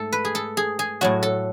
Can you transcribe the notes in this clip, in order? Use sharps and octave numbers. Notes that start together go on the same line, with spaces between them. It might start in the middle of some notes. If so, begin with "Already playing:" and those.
Already playing: G#2 A3 A4
B4
G#4
A4
G#4
G#4
A2 F#3 A3 F#4
A4